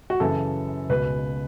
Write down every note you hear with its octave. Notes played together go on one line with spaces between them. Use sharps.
F#4
F#2 C#3 E3 A4
C#2 B2 B4